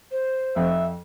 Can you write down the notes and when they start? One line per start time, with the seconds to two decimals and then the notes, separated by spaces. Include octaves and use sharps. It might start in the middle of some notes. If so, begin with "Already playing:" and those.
0.11 C5
0.56 F2 E5